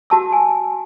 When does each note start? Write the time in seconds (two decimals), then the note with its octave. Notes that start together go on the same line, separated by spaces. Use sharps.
0.10 F#4 A5 E6
0.32 G#5